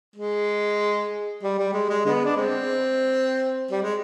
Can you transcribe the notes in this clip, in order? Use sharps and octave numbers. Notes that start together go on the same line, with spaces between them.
G#3
G3
G3
G#3
G#3
D3 G#3 B3
D4
G#3 C4
G3
G#3